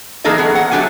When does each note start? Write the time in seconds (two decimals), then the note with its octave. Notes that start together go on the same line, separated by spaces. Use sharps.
0.24 E3 A#3 D#4 G#4 A4 D#5
0.38 F#3 B3 G#4
0.55 F#5
0.71 F#3 A3 D4 G4 G#5